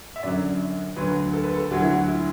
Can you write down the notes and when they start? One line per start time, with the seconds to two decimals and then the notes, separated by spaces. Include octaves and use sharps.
0.16 E5
0.23 F#2 D3 F#3 D5
0.96 D2 D3 F#3 B4
1.33 A4
1.44 B4
1.54 A4
1.70 D2 D3 F#3 F#4
1.80 E4
1.89 F#4
2.08 E4